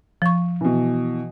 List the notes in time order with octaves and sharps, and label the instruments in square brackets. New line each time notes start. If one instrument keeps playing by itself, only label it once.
[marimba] F3 C#6
[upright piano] B2 E3